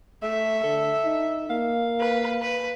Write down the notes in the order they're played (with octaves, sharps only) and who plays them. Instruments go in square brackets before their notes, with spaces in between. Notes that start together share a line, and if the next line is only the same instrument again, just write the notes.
[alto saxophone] A3 [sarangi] E5
[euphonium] D3 [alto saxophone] A4
[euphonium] D#4
[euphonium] A#3 [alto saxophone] F5
[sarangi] B4
B4